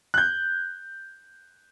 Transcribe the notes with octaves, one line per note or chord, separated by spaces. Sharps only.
F#6 G6